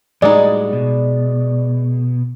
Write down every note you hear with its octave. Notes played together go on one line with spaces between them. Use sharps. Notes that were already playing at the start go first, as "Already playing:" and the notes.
A2 G3 G#3 D#4 F#4 D5
B2